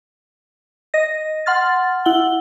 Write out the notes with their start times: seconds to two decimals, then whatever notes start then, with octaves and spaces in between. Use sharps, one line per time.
0.94 D#5 A#6
1.46 F#5 C6 F6 A6
2.05 E4 F#5 G7